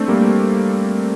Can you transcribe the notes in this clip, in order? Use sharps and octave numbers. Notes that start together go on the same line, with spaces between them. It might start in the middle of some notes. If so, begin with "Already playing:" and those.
Already playing: A3 C4 D4
G3 A#3